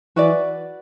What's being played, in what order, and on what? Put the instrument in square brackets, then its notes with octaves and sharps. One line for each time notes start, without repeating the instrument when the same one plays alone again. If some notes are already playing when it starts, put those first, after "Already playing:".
[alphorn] E3 [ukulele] F#4 B4 D5